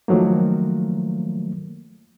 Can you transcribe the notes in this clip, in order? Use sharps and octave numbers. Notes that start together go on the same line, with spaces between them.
D#3 F3 F#3 A3 A#3